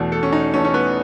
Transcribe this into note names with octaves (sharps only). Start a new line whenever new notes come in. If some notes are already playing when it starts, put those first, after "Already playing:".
Already playing: E2 B2 A3
A4
C#4
D#4
E2 B2 A3 C#4
C#4
B3